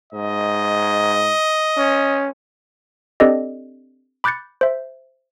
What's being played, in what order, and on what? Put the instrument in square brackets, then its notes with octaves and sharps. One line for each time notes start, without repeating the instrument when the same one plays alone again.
[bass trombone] G#2 [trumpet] D#5
[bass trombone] C#4
[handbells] C4 D4 G4 A4 D5 D#5
B5 D6 F#6 G6 A6 C#7
C5 E5